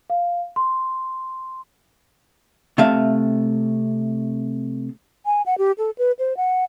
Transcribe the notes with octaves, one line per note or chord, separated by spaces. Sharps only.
F5
C6
C3 A3 E5 F5
G#5
F#5
G4
A4
B4
C5
F#5